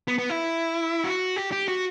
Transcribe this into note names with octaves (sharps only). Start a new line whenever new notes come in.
B3
B3
E4
F#4
G4
G4
F#4